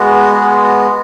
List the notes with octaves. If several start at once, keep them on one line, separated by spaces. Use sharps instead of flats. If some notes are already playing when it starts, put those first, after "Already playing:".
Already playing: G#3 B3 F#4
G#4
F#4